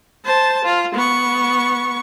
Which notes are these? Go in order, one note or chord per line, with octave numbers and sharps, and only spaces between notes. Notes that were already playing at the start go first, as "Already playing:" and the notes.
C5 A5
F4
B3 C#6